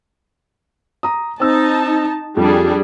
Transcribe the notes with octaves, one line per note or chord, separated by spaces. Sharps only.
A#5 D#6
C4 D#4 A5 E6
F2 G3 D4 G#4